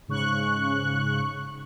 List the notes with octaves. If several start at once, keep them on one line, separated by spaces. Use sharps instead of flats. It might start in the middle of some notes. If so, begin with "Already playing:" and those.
G#2 C#3 C#6 F#6